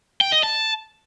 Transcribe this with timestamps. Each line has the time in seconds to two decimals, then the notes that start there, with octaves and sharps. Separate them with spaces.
0.21 G5
0.32 D#5
0.43 A5